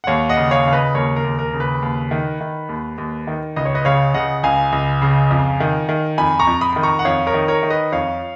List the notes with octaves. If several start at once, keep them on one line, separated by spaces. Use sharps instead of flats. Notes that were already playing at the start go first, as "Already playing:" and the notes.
F#5
D#2 C#5 F5
D#5 F#5
C#3
C#5 F5
C#3 F5
B4 D#5
D#2 A#4 C#5
A#4
D#2
A#4
C#3
B4
D#2
D#3
D#3
D#2
D#2
D#3
C#2 D#5
C#5
B4 D#5
C#3 C#5 F5
C#3 D#5 F#5
C#2 F5 G#5
C#2
C#3
F2
D#3
D#3
F2 G#5 B5
A#5 C#6
F2
B5 D#6
D#3 B5
A#5 C#6
F#5
F2 C#5 F5
A#4 C#5
D#3
A#4 C#5
D#3
B4 D#5
F2 C#5 F5